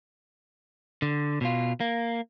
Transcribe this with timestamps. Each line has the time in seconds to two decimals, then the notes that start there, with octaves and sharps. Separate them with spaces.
1.02 D3
1.41 B2 F4
1.80 A#3